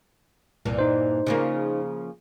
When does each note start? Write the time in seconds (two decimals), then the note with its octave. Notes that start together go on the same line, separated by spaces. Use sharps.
0.65 C2 G2 A#2 E3
0.79 D#4 C5
1.27 C#3 F3 A#3